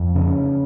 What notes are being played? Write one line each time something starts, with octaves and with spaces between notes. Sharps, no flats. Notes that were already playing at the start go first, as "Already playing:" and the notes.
Already playing: F2
C#3